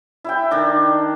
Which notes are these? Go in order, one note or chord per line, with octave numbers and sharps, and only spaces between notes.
E4 E5 G5
D#3 D4